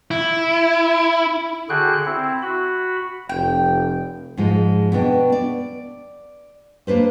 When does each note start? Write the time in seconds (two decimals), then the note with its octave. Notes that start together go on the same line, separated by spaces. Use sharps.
0.11 E4
1.69 D3 F#4 G#4 G5 F#6
2.06 C4 E4
2.42 F#4 B5
3.29 F1 G5
4.37 G#2 F3 G#3
4.92 B2 B3 D4 G5
5.32 D5
6.87 A#3 D4 B4 C5